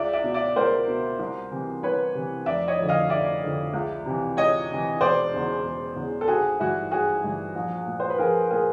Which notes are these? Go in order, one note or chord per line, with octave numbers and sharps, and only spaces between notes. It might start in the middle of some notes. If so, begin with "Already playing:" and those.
Already playing: C#2 D5 E5
D5 E5
B2
D5 E5
C#2 A#4 C5
B2
C2
C3 E3
C2 B4 C#5
C3 E3
F1 D5 E5
C#5 D#5
F2 D3
D#5 F5
F1 D5 E5
F2 D3
C#2
C3 E3
C#2 C#5 D#5
C3 E3
E1 C5 D5
E2 C#3
E1
E2 C#3
A4
G#1 F#4 G#4
G2 E3 E4 F#4
G#1 F#4 G#4
G2 E3
A#1
A#2
C5
B4
A#1 G#4 A#4
A#2 G#4 A#4